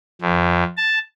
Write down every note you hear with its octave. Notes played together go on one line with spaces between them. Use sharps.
F2
A5